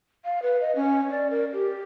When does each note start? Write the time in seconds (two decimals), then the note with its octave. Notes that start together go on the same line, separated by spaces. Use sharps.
0.25 F5
0.42 B4
0.61 D#5
0.76 C#4
1.11 D5
1.31 A#4
1.53 G4